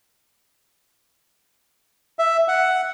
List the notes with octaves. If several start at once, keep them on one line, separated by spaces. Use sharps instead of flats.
E5
F#5